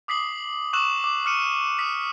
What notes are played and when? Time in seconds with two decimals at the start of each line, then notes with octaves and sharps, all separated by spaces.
0.08 D6 D#6 B6 C7 F#7
0.73 C#6 D6 E6 F#6 E7 F#7
1.04 D6
1.25 D6 F6 C#7 D#7
1.79 D#6 B6